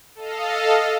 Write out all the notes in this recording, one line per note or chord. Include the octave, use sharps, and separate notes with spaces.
A4 D#5 F5